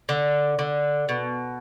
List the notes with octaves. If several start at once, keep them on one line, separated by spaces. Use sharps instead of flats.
D3
D3
B2